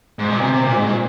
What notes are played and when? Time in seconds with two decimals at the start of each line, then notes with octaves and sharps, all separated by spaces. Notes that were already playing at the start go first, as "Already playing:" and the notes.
0.19 G#2
0.30 A#2
0.41 C3
0.53 C3
0.64 A#2
0.76 G#2
0.86 A#2